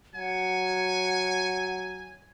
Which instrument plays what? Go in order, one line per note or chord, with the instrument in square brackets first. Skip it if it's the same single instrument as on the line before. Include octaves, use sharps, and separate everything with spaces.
[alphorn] F#3 [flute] F#5 [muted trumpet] G#5